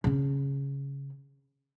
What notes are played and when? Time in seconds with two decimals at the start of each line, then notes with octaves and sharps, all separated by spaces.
0.04 C#3 C#4